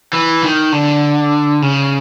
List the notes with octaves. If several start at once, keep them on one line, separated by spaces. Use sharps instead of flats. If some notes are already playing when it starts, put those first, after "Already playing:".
E3
D#3
D3
C#3